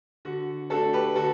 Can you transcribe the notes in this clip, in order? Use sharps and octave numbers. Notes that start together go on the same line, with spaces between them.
D3 F#4
A3 D4 F#4 A4
G4 B4
D3 F#4 A4